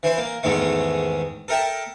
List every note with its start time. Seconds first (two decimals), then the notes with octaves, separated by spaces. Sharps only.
0.03 E3 E4 C5
0.18 A#3
0.43 E2 G#2 D#3 G#3 A3
1.48 A4 A#4 E5 G5 A5